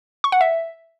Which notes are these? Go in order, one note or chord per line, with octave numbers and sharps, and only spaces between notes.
C#6
F#5
E5